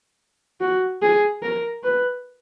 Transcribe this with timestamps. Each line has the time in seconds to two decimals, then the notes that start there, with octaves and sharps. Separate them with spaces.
0.61 F#4
1.02 G#4
1.43 A#4
1.84 B4